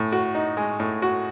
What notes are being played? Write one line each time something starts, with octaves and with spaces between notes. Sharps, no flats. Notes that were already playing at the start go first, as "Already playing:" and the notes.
Already playing: A2
F#4
D#4
G#3
A2
F#4